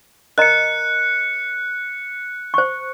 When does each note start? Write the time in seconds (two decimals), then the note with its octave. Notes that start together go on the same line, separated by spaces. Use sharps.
0.38 A#4 D#5 A#5 F#6 C#7
2.54 C5 C#6